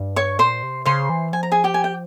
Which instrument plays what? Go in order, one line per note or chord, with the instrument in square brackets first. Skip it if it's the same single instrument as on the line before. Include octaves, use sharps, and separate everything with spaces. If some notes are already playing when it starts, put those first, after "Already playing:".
Already playing: [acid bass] G2
[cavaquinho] C#5 C#6
[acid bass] A#2 [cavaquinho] C5 C6
[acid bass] C3
[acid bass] C#3 [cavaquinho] C5 C6
[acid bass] E3
[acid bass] F3 [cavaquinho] G#5
[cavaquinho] A#5
G#4 G#5
G4 G5
G#5
G5